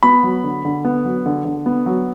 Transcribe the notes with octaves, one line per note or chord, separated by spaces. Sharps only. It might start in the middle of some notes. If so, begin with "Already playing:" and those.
B3 B5
F#3
D3
D3
B3
F#3
D3
D3
B3
F#3